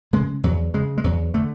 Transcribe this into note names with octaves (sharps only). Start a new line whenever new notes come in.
C#3 G#3
E2 F#3
C#3 G#3
G#3
E2 F#3
D3 A3